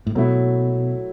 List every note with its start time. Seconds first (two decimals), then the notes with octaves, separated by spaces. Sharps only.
0.07 A2
0.15 B2 F#3 A3 E4